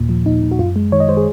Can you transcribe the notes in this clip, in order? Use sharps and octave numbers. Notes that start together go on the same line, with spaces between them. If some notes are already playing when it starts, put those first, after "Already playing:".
Already playing: D#2 A#2
F3
A#2 D#4
A#2
F#4
F#2 F4
G#3
D#3 C#5
D#5
G#3 C5
G#4